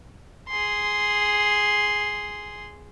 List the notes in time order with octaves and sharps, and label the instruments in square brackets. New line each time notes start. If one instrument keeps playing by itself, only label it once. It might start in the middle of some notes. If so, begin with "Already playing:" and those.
[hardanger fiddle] G#4 C6